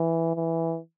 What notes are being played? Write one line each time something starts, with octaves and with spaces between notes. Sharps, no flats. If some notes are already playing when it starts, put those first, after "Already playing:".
Already playing: E3
E3